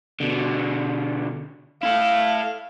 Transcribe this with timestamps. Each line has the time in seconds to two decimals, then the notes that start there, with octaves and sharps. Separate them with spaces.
0.20 B2 D3
1.83 E4 A4 F5